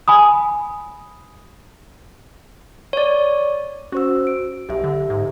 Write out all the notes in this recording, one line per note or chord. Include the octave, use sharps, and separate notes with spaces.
G#5 B5 D#6
C#5 D5
C#4 F#4 C5 E6
D7
B1 G4 E5
D3
G#2